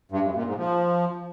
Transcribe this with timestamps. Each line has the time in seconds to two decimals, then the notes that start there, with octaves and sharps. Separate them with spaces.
0.12 G2
0.23 F#2
0.35 A#2
0.46 G#2
0.58 F3